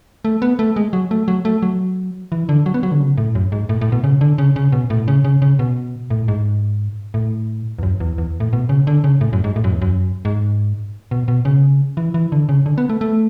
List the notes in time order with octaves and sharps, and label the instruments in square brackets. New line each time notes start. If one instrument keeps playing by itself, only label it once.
[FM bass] A3
B3
A3
G#3
F#3
A3
F#3
A3
F#3
E3
D3
F#3
B3
F#3
D3
C#3
A2
F#2
G#2
A2
A2
B2
C#3
D3
C#3
C#3
B2
A2
C#3
C#3
C#3
B2
A2
G#2
A2
E2
F#2
E2
E2
A2
B2
C#3
D3
C#3
A2
F#2
G#2
A2
F#2
E2
F#2
G#2
B2
B2
C#3
E3
E3
D3
C#3
D3
B3
A3
A3